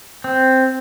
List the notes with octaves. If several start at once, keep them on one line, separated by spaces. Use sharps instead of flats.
C4